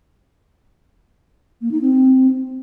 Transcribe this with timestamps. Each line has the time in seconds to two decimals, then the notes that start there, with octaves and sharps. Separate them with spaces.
1.61 A#3
1.71 D#4
1.81 C4